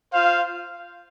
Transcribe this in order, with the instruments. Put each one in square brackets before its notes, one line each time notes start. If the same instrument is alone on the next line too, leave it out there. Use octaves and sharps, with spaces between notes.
[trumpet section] F4 C5 F5